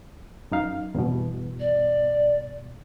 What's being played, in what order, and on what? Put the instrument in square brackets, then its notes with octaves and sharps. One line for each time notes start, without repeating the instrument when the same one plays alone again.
[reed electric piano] F#2 D#4 F5
E2 G2 B2
[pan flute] D5